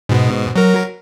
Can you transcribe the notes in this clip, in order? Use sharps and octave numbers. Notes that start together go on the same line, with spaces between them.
G#2 B2
F#3 A#4